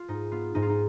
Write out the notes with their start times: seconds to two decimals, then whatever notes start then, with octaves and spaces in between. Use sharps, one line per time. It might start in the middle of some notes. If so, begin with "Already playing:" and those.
Already playing: F4
0.08 G#2 D#4
0.32 B3 F4
0.55 G#2 D#4
0.62 F4
0.69 D#4